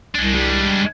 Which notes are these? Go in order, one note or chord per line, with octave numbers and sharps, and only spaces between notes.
C2 G#3 D4
G3